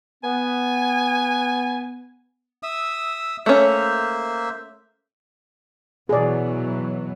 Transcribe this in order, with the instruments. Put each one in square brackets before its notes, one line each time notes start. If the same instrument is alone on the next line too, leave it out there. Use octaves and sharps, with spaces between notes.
[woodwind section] B3 [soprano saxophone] G#5
[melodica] E5 D#6 E6
[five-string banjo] A3 C#4 [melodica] A#3 C5 E5
[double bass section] B2 E3 F#3 [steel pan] G#4 D5